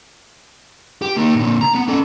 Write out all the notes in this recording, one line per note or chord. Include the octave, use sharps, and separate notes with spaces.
G4
A#3 D#4
A#2 D3
A#5
B3
C#4 A4